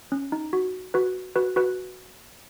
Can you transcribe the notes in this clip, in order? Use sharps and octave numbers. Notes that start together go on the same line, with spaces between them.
C#4
D#4
F#4
F#4 B4
F#4 B4
F#4 B4